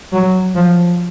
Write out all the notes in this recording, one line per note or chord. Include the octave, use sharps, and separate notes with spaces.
F#3
F3